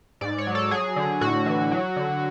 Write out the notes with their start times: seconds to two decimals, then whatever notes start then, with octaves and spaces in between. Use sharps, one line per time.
0.21 G#2 D5
0.38 C#5
0.47 F#3
0.55 A4
0.71 F#3 G#4
0.96 D3
1.21 A2 F#4
1.46 E3
1.71 F#3
1.96 D3